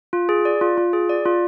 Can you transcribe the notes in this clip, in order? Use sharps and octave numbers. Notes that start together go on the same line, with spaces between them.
F4
G#4
D5
F4
F4
G#4
D5
F4